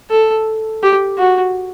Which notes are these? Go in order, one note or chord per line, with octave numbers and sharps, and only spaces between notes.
A4
G4
F#4